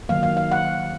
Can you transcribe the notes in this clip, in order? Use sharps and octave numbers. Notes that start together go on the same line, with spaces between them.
D#3 F#3 A#3 F5
F5
F5
F#5